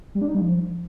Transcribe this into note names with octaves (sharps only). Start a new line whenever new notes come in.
G3
D4
D#4
G3
F3